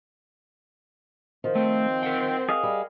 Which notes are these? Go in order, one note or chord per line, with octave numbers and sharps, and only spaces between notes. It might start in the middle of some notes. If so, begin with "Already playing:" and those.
D#3 F3
A3 C4
A#4 F#5 G5
G#4 D#5 F5
G3